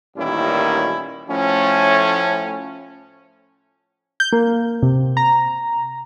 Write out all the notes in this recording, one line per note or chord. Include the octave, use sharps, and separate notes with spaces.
A1 A#2 D#3 G3 C#4 E4
A2 F3 A3 C#4
G6
A#3
C3
A#5